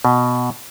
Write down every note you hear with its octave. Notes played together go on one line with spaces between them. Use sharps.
B2